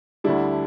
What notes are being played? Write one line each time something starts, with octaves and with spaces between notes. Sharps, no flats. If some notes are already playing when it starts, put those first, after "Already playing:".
D2 D3 G3 D4 E4